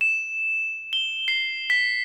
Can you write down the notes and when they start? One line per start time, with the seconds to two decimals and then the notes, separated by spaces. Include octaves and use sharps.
0.01 E7
0.93 G7
1.28 C7
1.70 B6